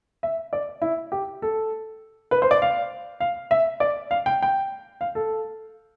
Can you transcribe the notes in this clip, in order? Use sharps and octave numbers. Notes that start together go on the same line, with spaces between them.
E5
D5
E4
G4
A4
B4
C5
D5
F5
F5
E5
D5
F5
G5
G5
F5
A4